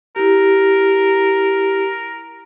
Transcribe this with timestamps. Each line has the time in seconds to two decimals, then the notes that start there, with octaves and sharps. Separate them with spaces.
0.16 E4 G4 A#4